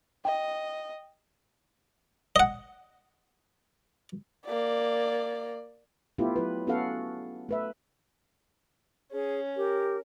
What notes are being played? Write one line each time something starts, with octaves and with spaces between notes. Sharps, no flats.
D#5 G5
D#5 F#5
A#3 D5
A3 B3 E4 F4 G4
F#3 E4 B4
B3 C#4 F#4 A4 F5 F#5
A3 B4 E5
C#4 G#4
G4 A#4